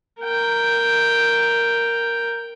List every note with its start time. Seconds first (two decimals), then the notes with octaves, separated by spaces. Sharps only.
0.22 A#4 G5